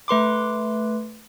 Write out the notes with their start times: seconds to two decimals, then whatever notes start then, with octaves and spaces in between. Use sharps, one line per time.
0.08 A3 B4 C6 D6